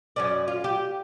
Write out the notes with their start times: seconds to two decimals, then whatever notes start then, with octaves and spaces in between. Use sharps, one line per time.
0.16 F#2 C#4 D5
0.48 F4
0.64 G4